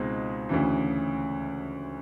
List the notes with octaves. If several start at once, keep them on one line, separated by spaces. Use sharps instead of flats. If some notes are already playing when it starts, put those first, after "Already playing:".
Already playing: C#2 B2 G#3 C4 D#4
D2 C#3 E3